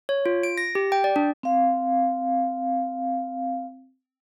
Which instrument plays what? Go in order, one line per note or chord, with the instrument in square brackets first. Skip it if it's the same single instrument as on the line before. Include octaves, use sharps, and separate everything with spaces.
[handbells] C#5
F4
D7
A#6
G4
G5
D5
D4
[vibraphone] C4 F5